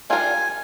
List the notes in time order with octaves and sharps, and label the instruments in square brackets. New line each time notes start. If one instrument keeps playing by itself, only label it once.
[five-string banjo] G3 D4 F4 A#4 D5 [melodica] G#5